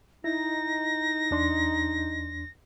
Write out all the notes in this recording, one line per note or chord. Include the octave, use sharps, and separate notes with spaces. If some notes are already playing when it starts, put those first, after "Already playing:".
D#4 E4 A#6
E2 D4 C6